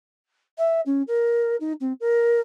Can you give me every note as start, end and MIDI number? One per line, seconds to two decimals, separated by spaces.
0.58 0.81 76
0.86 1.02 61
1.08 1.56 70
1.60 1.73 63
1.81 1.93 60
2.00 2.40 70